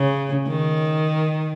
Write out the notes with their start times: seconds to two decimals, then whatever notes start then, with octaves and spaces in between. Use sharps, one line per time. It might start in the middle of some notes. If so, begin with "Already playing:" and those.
Already playing: C#3
0.47 D#3